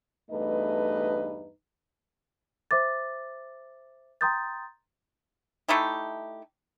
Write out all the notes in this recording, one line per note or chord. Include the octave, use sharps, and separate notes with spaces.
E2 G2 A3 D#4 B4 D#5
C5 E5 D6 A6
G5 A#5 C6 D#6 G6 A6
A3 D#4 E4 G4